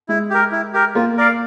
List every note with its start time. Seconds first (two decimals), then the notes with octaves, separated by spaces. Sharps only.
0.09 G#3 E4
0.30 G4 A#4
0.52 E4
0.73 G4 A#4
0.95 A#3 F4
1.17 A#4 D5 F5